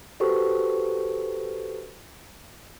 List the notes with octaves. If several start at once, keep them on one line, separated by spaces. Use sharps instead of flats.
F#4 G4 A4 B4 C5 C#6